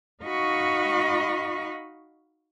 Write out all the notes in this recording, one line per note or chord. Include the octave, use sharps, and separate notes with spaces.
D#4 F#4 D#5 F5 B5 C#6